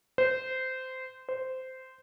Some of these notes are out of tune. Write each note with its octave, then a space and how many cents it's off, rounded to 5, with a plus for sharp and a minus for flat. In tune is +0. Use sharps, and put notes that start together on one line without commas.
C5 -20
C5 -15